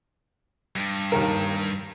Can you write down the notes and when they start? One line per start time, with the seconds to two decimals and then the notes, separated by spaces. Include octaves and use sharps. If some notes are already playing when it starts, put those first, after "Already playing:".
0.76 G2
1.12 D#2 D#3 A#4